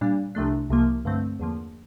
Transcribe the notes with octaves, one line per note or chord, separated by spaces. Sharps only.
A#2 G3 D4
C2 C3 F3 A3 D4
C2 C3 F3 A#3
G2 D3 A3 C4
E2 D3 F3 A#3